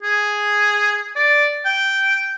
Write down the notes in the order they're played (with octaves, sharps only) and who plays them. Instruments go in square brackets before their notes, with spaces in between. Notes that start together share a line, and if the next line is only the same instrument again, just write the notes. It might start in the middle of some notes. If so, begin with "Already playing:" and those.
[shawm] G#4
D5
G5